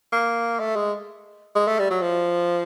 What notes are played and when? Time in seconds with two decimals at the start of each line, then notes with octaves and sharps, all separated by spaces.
0.13 A#3
0.60 A3
0.76 G#3
1.55 G#3
1.68 A3
1.79 G3
1.90 F#3
2.02 F3